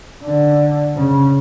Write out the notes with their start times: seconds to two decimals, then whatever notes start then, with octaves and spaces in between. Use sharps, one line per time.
0.24 D3
0.96 C#3